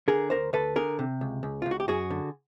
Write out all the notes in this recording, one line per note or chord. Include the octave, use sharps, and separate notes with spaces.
D3 G#4 A#4
D2 A#4 C5
D2 A4 B4
D3 G#4 A#4
C3
C#2
C#2
F4
C#2
F#4
G4
F#2 F#4 G#4
D3